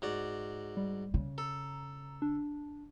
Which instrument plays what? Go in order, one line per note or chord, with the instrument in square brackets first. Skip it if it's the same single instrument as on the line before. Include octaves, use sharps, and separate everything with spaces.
[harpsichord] G#2 F#4 D5
[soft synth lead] G3
[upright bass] C#3
[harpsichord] A4 [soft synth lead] A#5
[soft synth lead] D4